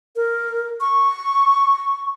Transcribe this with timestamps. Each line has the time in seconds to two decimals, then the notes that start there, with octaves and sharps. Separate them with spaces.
0.16 A#4
0.81 C#6